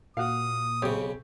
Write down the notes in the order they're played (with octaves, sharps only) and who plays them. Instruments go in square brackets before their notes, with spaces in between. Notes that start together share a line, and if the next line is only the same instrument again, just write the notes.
[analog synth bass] A#2 [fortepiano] F#4 F5 [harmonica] D#6
[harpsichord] B1 C#3 [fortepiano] C4 G4 C#5